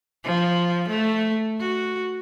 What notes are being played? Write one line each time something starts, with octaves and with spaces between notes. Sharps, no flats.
F3
A3
F#4